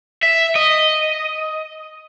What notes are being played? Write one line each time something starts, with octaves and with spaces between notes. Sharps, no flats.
E5
D#5